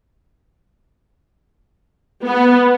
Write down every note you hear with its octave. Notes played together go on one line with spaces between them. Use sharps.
B3